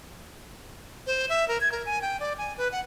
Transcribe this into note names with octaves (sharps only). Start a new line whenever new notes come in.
C5
E5
A#4
G#6
A#4
G#5
G5
D5
G#5
B4
F#5